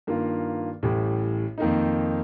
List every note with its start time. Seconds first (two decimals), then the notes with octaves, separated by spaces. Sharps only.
0.07 G2 D#3 A#3 F4
0.83 A1 A2 G3
1.58 F2 D#3 A#3 D#4